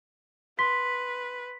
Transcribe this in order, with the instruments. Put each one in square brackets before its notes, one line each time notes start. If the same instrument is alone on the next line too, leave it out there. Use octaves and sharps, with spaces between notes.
[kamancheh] B4 [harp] C6 [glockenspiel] B6